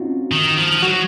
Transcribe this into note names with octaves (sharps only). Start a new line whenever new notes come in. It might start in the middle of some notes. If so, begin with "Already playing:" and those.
Already playing: C4 C#4 D#4 F4 F#4
D#3
F3
F#3 F#4